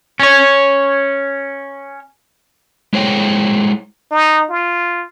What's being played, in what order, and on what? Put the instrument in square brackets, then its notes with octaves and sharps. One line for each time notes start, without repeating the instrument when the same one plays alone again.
[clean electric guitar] C#4 C#5
[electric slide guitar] G#3 E4 G#4 C5 C#5 G5
[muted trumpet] D#4
F4